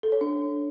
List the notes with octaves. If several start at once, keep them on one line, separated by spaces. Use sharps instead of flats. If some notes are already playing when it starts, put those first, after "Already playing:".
A4
C#5
D4